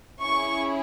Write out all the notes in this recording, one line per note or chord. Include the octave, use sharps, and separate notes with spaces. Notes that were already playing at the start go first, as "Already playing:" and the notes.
C#4 E4 G#4 C#6